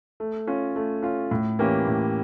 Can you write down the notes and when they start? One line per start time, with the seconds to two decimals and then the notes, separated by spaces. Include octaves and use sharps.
0.20 A3
0.47 C#4 F4
0.76 A3
1.02 C#4 F4
1.31 A2
1.59 E3 A#3 C#4 G4
1.87 A2